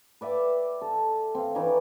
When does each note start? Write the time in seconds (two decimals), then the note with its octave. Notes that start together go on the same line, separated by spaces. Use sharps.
0.21 B4 D5 E5 G5
0.82 A4
1.35 C4 F5
1.55 E3 D#4 C#5 D5